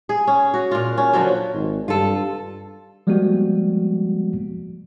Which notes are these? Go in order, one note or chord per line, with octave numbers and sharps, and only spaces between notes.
G#4
C#4
F#4
A#2 F4
C#4
D3 F3 F#3
G#1
G2 F4 A4
F3 G3 G#3 A#3 B3 F#4